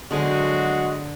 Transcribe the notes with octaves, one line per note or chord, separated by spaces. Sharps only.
D3 F#3 G#3 F#4 C5 G#5